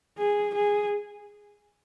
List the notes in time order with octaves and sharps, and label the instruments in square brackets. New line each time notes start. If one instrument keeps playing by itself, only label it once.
[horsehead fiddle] G#4
G#4